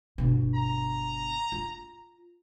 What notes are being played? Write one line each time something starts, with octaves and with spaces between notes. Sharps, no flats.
G1 B2
A#5
F4